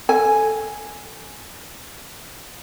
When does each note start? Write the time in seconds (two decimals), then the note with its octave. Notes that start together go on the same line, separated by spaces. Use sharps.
0.09 A4 G#5